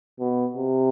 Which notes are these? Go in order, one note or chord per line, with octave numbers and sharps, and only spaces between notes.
B2
C3